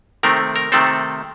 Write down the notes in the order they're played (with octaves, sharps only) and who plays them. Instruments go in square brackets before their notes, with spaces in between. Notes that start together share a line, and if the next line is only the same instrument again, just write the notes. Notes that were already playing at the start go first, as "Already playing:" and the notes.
[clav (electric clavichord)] C3 D#3 A3 C4 A#4
A#4
C3 D#3 A3 C4 A4